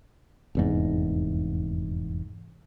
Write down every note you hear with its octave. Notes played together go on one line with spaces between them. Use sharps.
F1 E2 G#2